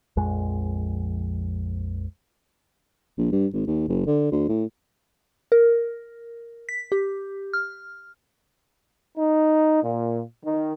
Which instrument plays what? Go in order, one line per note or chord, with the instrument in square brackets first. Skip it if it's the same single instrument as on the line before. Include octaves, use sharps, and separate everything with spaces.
[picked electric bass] A#1 F2 G#3
[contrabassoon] A#1
G2
G#1
D#2
F#1
D3
D2
A2
[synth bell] A#4
B6
G4
F6
[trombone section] D#4
A#2
D#3